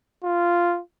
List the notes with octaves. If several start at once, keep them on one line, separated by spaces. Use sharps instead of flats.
F4